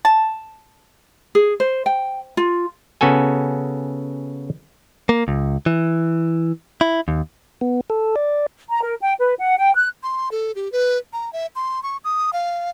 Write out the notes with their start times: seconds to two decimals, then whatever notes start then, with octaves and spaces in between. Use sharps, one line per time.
0.05 A5
1.35 G#4
1.60 C5
1.86 G5
2.37 F4
3.01 C#3 B3 F#4 A4 G#5
5.09 A#3
5.28 C#2
5.66 E3
6.81 E4
7.08 D#2
7.61 B3
7.90 A4
8.16 D5
8.69 A#5
8.83 A#4
9.02 G5
9.19 B4
9.39 F#5
9.57 G5
9.75 F#6
10.03 C6
10.31 A4
10.55 G4
10.72 B4
11.13 A#5
11.33 E5
11.56 C6
11.83 C#6
12.04 D#6
12.33 F5